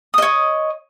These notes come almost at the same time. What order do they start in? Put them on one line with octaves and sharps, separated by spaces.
D#6 D#5 C#5